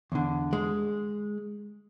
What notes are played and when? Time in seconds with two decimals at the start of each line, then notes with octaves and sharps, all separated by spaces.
0.12 E2 D3
0.53 G#3